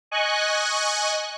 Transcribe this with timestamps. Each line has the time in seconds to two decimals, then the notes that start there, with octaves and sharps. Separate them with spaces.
0.11 D#5 G#5 C#6 F#6